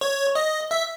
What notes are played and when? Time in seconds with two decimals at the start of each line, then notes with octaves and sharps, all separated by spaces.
0.01 C#5
0.35 D#5
0.71 E5